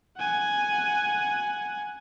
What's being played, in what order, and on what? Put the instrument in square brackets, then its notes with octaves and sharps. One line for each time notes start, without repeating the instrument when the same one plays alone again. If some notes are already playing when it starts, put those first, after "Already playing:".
[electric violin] F#5 G#5